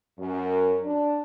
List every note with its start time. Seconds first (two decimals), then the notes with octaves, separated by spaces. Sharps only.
0.19 F#2
0.84 D4